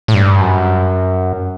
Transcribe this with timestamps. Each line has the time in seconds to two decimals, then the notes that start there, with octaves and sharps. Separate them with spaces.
0.08 A2
0.14 G2
0.41 F#2